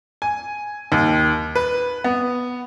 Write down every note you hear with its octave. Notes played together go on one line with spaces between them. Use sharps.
G#5
D#2
B4
B3